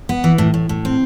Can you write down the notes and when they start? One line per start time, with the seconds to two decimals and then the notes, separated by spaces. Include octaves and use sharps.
0.09 B3
0.24 E3
0.38 A2
0.54 A2
0.69 A2
0.85 C4